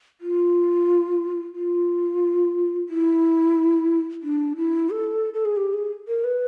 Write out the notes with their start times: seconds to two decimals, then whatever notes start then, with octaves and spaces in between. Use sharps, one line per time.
0.21 F4
1.55 F4
2.89 E4
4.23 D4
4.57 E4
4.90 A4
5.34 A4
5.45 G#4
5.57 G4
5.73 G#4
6.08 A#4
6.24 B4